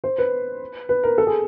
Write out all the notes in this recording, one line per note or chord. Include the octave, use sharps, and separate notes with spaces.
C5
B4
B4
A#4
A4
G#4